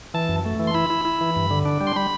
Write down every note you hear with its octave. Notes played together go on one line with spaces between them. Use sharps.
E3 A5
F#2
A3
E3
C6
E4 B5
E4
E4
E3
G2
D3
D4
G3
C6
G3 B5